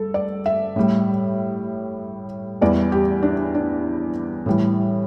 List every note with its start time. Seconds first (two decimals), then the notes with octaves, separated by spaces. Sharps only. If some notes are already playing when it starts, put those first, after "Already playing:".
Already playing: G2 A4
0.14 D5
0.46 E5
0.76 A2 G3
2.61 E2 E3 G3 D5
2.92 G4
3.23 D4
3.55 D4
4.46 A2 E3 G3